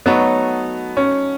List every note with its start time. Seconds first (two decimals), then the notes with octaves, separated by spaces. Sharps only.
0.06 F#3 A3 B3 D#4 F#4 C#5
0.97 C#4